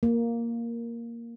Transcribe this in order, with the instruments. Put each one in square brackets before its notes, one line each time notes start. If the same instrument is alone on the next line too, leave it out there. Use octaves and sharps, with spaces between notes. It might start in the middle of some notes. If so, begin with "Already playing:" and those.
[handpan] A#3